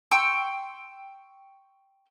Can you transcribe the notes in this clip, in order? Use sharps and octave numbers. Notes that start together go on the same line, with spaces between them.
G5 C6 C#6 E6